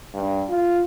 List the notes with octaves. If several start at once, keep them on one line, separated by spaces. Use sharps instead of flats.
G2
F4